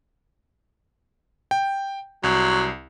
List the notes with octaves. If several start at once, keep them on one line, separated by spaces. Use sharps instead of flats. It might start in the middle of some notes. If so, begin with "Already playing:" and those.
G5
C2 F#3